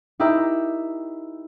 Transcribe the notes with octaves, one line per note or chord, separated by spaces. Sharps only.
D#4 E4 G4 A#4 E5